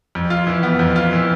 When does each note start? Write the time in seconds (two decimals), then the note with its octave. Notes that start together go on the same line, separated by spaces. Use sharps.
0.15 F2
0.30 F4
0.47 E3
0.63 B3
0.79 F2
0.96 F4
1.13 E3